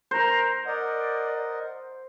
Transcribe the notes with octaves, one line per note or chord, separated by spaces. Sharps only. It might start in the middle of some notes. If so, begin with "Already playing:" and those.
A#4 C5
A#4 D5 D#5 F#5